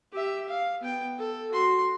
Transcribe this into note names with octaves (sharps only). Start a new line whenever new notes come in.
G4 E5
F5
B3 G5
A4
F#4 C6